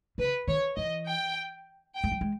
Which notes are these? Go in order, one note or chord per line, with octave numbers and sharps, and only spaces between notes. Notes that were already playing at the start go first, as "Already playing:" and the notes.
C#3 B4
D#3 C#5
E3 D#5
G5
G5
G#3
G3
G#3